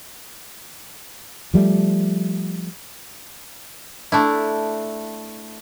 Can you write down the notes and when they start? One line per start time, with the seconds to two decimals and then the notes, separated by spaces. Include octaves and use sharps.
1.54 F3 G3 A3
4.12 A3 D4 E4